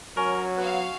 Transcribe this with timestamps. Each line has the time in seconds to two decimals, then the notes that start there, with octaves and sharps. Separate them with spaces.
0.17 F#3 C#4 A#4
0.57 B3 F#4 F5